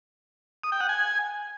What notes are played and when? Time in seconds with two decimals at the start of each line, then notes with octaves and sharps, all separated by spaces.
0.64 D#6
0.72 G5
0.81 F#5
0.89 G#5